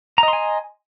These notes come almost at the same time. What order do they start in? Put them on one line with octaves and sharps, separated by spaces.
A#5 D#5 C6 G#5